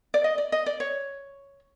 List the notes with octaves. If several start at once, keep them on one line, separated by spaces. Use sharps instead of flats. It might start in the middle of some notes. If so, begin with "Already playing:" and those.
D5
D#5
D5
D#5
D5
C#5